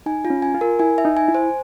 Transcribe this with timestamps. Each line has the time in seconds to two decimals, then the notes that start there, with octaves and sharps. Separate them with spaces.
0.06 D#4 G#5
0.25 F4
0.30 C#4
0.42 G#5
0.54 F4
0.61 A#4
0.79 E4 G#5
0.98 E5
1.05 D#4
1.17 G#5
1.28 E4
1.35 C5